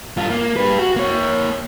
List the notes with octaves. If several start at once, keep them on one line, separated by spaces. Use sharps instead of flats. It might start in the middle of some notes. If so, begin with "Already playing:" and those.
G2 F4
A#3
G3 B4
F#4
A#3 C#5